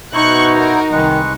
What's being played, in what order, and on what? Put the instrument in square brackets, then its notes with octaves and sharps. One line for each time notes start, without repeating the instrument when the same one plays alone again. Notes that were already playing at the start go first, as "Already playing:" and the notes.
[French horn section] B2 [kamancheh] D#4 [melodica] E4 C5 [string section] C#6 F#6
[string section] F#4 A#4
[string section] C2 [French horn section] D#3 [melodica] G#3 B4 C#6